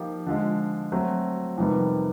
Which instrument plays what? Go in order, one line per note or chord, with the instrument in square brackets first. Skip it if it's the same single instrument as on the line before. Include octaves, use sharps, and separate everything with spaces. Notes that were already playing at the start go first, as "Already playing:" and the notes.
Already playing: [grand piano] F3 A#3 D#4 G4
D3 F3 G#3
F#3 A3 C4
F2 C3 D#3 G3 B3